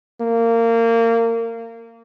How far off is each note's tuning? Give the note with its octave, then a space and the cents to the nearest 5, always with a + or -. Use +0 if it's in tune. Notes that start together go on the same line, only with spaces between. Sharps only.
A#3 -25